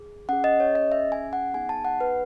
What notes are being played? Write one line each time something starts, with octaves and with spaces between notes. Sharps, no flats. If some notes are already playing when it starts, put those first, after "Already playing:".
Already playing: G#4
C#4 G#4 F#5
D#5
C#5
D#5
E5
G#5
F#5
B3 D#4 G#4 G#5
A5
F#5
B4